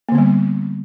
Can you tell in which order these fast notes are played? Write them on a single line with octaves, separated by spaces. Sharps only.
A#3 D3 B3 G3